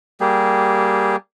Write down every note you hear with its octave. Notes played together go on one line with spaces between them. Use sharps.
G3 A#3 G4 G#4